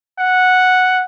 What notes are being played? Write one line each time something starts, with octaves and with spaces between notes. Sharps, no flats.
F#5